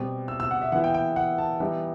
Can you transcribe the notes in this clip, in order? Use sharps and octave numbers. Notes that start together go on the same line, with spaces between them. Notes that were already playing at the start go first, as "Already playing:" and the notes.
Already playing: B2 G3 C4
E6
E6
F#5
E5
E3 B3 E4 F#5
G5
G5
F#5
A5
E3 G3 B3 D#4